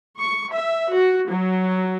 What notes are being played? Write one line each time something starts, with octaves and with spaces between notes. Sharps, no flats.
C#6
E5
F#4
F#3